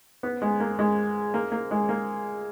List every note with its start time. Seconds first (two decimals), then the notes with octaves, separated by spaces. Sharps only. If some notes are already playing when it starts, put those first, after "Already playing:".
0.23 B3
0.42 G#3
0.60 A#3
0.79 G#3
1.34 A#3
1.52 A#3
1.71 G#3
1.89 A#3